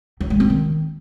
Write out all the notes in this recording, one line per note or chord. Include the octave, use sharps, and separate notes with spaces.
F#3
G#3
C4
D#3